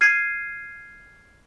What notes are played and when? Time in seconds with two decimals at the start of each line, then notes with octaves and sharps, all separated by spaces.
0.01 F6 G#6 C7 D#7